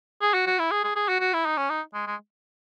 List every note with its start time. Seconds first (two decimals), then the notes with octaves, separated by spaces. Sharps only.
0.22 G#4
0.34 F#4
0.47 F#4
0.59 E4
0.71 G#4
0.84 G#4
0.96 G#4
1.09 F#4
1.20 F#4
1.34 E4
1.46 D#4
1.57 C#4
1.70 D#4
1.94 G#3
2.07 G#3